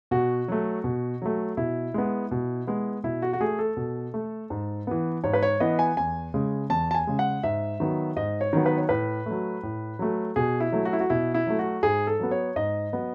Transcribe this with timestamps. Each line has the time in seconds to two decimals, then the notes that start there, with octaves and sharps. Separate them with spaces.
0.11 B2 F#4
0.48 F#3 A3
0.84 B2
1.22 F#3 A3
1.57 B2 E4
1.94 G#3 B3
2.31 B2
2.67 G#3 B3
3.04 B2 E4
3.22 F#4
3.33 F#4
3.40 A3 G#4
3.59 A4
3.77 B2
4.14 A3
4.50 G#2
4.87 E3 B3
5.24 G#2 C#5
5.33 B4
5.43 C#5
5.60 E3 B3 D#5
5.79 G#5
5.97 E2 G#5
6.34 C#3 G#3
6.70 E2 A5
6.91 A5
6.95 G#5
7.07 C#3 G#3
7.19 F#5
7.43 G#2 E5
7.80 D#3 F#3 B3
8.16 G#2 D#5
8.41 C#5
8.53 D#3 F#3 B3
8.66 B4
8.78 C#5
8.89 A2 B4
9.26 F#3 A3
9.63 A2
9.99 F#3 A3
10.36 B2 G#4
10.60 E4
10.72 F#3 A3
10.85 F#4
10.93 E4
11.00 F#4
11.10 B2 E4
11.34 E4
11.47 F#3 A3
11.59 F#4
11.83 G#2 G#4
12.07 A4
12.19 F#3 B3
12.31 C#5
12.56 G#2 D#5
12.93 F#3 B3